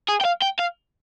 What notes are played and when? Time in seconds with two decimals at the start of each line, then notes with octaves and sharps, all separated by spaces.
0.09 G#4
0.21 G5
0.25 F5
0.42 G5
0.59 F5